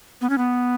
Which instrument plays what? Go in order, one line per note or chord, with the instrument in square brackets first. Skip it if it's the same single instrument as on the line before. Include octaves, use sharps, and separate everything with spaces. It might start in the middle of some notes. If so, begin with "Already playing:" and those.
[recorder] B3
C#4
B3